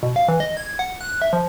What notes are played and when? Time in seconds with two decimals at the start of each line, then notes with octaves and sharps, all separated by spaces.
0.03 B2
0.16 F5
0.28 E3
0.40 D#5
0.57 G#6
0.79 F#5
1.01 F#6
1.22 E5
1.33 F3